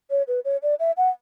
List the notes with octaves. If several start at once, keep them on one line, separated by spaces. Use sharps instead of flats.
C#5
B4
C#5
D5
E5
F#5